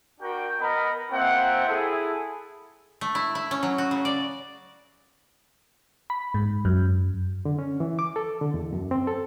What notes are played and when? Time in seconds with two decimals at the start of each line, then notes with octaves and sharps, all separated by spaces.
0.20 D4 F#4 A#4 G5
0.61 B3 A#4 D#5 A#5 B5
1.11 A#3 C4 F4 E5 F#5 G5
1.67 E4 G#4 A4
3.01 A3
3.15 E4
3.35 E4
3.51 C#4
3.63 F#3
3.78 F#4
3.91 C#3
4.05 D5
6.10 B5
6.34 G#2
6.65 F#2
7.45 D3
7.59 C#4
7.80 E3
7.99 D6
8.16 A4
8.41 D3
8.54 E2
8.73 F#2
8.91 C4
9.07 A4